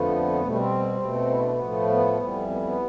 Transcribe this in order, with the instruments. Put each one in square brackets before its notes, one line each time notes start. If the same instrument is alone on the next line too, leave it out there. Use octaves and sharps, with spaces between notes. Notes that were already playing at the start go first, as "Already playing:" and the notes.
Already playing: [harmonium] F2 D3 F3 A3 B3
B2 G3 A3
C4
B2 A3
E4
D4
B3
A2 F3 A3
B3
F2 E3 G3
B3
B3